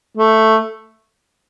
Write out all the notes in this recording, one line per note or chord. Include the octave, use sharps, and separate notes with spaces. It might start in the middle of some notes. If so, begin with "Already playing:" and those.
A3